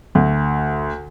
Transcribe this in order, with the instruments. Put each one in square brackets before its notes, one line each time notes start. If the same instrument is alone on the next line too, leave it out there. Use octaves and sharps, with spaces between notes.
[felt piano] D2